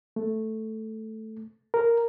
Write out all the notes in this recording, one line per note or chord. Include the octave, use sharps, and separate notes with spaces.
A3
A#4